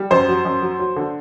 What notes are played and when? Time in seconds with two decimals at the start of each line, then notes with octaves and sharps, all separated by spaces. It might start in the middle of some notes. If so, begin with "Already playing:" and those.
Already playing: G3
0.11 F#2 C5
0.28 F#3
0.45 F#2
0.62 F#3
0.79 F#3
0.96 D3